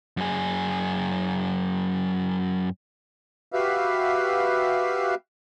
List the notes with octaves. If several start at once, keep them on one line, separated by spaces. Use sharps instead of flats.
F#2 G#4
F#4 G4 B4 E5 F5